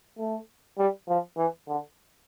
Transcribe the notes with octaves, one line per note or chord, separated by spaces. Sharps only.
A3
G3
F3
E3
D3